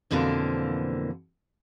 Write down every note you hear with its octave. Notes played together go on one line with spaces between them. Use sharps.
F2 B2 D3 E3 A#3 C5